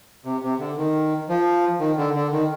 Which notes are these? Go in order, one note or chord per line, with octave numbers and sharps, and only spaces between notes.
C3
C3
D3
D#3
F3
D#3
D3
D3
D#3